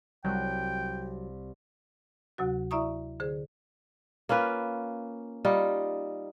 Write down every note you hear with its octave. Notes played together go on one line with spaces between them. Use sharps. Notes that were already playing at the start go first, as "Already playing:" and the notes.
C2 F#3 G5 F#6
D2 C3 F#3 F#4
E4 D5 E5 A#5 C#6 D#6
D3 G#4 C5
A#3 C#4 F4 B4
G3 D#4 F4